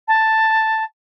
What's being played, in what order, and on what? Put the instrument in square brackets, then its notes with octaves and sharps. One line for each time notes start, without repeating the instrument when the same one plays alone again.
[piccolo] A5